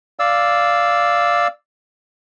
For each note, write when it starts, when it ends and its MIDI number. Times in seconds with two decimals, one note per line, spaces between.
0.19 1.47 74
0.19 1.47 77
0.19 1.47 88